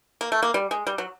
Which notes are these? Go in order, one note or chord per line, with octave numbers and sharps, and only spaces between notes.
A#3
A3
A#3
G3
G#3
G3
F#3